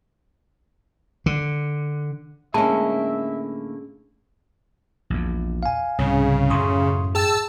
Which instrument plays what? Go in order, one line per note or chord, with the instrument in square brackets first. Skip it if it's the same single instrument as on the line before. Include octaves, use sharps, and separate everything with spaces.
[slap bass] D3
[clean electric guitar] A2 D3 A#3 [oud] G#3 C#4 [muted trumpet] E5 [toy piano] A5
[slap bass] A#1 E2
[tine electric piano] F5 G#5
[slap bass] C2 G#2 [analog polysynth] C#3
[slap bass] F#2 A2 [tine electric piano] C6 C#6 D#6
[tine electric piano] G#4 G5 [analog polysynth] A5 E6